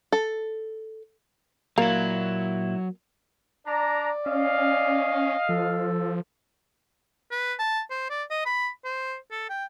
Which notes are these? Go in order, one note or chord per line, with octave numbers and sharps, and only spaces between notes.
A4
A#2 F#3 A#3 E4
D4 D5 A#5
C#4 D#5 F5
F3 A4
B4
A5
C5
D5
D#5
B5
C5
A4
G5